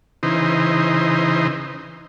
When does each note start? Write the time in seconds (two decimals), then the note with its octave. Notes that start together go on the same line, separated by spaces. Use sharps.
0.23 C#3 E3 D#4 C5